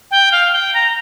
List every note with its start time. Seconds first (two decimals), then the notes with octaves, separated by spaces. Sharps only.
0.11 G5
0.32 F5
0.52 G5
0.74 A#5